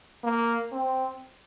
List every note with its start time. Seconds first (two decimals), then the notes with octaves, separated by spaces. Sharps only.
0.24 A#3
0.72 C4